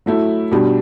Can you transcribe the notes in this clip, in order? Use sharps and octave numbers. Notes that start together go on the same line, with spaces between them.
F#3 A3 E4
B2 G3 D4